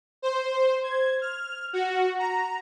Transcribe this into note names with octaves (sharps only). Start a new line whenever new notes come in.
C5
G#6
F6
F#4
A#5